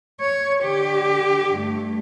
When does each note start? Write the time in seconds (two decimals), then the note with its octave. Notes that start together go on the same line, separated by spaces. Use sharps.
0.21 C#5
0.64 D3 G4
1.53 G2 A3